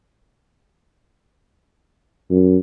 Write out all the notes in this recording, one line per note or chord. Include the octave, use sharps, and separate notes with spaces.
F#2